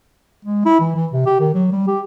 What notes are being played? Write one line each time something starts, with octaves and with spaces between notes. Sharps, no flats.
G#3
E4
E3
E3
C3
G4
D#3
F#3
G3
G4